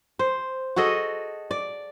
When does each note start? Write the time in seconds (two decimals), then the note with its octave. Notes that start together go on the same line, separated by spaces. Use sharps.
0.19 C5
0.76 F#4 G#4 A4 D#5
1.51 D5